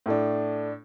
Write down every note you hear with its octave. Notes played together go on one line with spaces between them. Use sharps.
A2 A3 D4